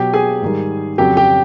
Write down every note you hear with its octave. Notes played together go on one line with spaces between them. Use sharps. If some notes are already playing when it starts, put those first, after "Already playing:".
Already playing: B2 F#3 G4 G5
G#4 G#5
G#2 D#3 G3
F2 C#3 F#3 G4 G5
G4 G5